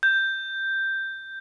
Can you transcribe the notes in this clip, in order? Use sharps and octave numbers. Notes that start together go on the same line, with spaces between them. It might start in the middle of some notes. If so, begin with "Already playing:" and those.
G6